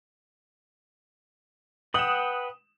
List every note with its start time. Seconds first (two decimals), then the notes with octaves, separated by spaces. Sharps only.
1.94 B4 F#5 G5 D#6 E7